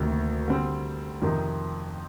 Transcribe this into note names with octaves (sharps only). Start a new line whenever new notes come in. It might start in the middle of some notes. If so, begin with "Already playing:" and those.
Already playing: D2 C3 D#3 A#3
D3 G3 C4
F2 C3 D#3